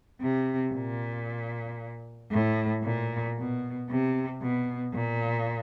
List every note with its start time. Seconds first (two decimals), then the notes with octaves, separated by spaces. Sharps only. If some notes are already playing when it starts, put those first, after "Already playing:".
0.21 C3
0.74 A#2
2.31 A2
2.83 A#2
3.37 B2
3.89 C3
4.41 B2
4.94 A#2